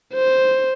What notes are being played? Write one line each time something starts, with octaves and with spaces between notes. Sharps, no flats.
C5